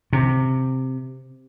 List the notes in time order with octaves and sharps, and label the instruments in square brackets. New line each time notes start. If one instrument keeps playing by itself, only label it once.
[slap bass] C3